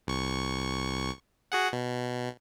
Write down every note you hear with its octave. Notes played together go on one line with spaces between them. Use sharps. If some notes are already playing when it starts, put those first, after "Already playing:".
C2 C#6
F#4 G#4 F#5
B2